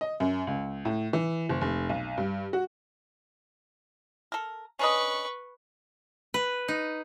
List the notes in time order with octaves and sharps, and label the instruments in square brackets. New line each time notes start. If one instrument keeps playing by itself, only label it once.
[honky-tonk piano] D#5
F#2
C#2
A2
E3
F#1
F1
B1
G2
F#4
[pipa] A4 A#4
[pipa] C#4 D4 D#5 [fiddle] B4 C#6
[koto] B4
D#4